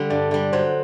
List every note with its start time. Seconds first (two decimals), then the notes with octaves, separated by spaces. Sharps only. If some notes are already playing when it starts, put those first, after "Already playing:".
Already playing: D3 G3
0.10 G2 D5
0.31 D3 G3 D5
0.52 F#3 C5